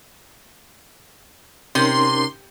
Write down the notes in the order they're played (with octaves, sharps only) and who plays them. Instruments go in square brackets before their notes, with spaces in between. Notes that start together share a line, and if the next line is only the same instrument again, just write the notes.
[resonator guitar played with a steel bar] C3 [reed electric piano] C#4 D#4 A#4 [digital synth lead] C6